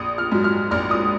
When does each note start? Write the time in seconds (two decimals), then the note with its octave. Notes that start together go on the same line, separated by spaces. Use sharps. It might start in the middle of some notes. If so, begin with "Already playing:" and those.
Already playing: A#1 D#6
0.18 F6
0.32 G#2 F#3
0.44 F6
0.71 A#1 F6
0.91 D#6